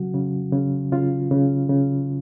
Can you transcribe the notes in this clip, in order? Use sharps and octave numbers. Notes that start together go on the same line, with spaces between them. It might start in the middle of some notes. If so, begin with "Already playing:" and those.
Already playing: C#3 F#3 F#4
C#3
C#3
C#3 F4
C#3
C#3